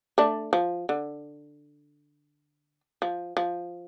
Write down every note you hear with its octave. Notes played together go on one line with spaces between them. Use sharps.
A3 D4
F3
D3
F3
F3